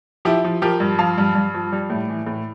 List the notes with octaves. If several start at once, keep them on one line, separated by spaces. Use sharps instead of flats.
F3 E4 G4
F3
F3 G4 A#4
G2
F3 F5 A5
G2
G2
F3
G3
A2
E3
A2